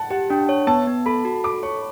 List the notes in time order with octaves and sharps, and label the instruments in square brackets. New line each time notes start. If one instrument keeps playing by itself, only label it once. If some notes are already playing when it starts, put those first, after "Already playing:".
Already playing: [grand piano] F#5 A5
[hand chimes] G4 [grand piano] F#5
[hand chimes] D4 [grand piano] G5
[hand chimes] C#5
[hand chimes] B3 [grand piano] A5
[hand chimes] B3
[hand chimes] A4 [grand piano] B5
[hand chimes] F#4
[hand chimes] A4 [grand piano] D6
[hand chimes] C#5 [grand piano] C#6